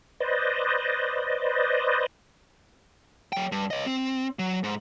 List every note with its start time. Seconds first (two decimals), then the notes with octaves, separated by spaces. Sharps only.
0.20 B4 C5 D5 D#5
3.33 F#3 G5
3.52 G2
3.71 C#5 D#5
3.86 C4
4.39 F#3
4.64 G#2